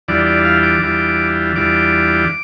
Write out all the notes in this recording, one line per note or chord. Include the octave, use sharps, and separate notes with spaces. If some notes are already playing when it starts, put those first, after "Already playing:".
E2 E3 G3 D4 F4 D5
D5
F5
D6
E2 E3 G3 D4 F4
E2 E3 G3 D4 F4 D6